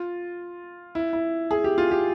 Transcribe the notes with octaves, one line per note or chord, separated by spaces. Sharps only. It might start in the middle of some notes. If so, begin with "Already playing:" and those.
Already playing: F4
E4
E4
G#4
G4
F4
G4